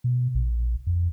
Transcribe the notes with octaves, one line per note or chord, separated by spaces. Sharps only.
B2
A#1
F2